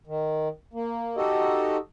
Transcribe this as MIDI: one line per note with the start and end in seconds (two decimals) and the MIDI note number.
0.07 0.48 51
0.74 1.16 58
1.17 1.77 63
1.17 1.77 66
1.17 1.77 67
1.17 1.77 69
1.17 1.77 75